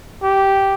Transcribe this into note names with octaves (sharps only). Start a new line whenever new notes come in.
G4